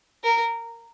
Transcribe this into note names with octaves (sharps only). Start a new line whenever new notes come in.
A#4